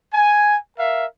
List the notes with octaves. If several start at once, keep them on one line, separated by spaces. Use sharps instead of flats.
G#5
A#4 E5 F5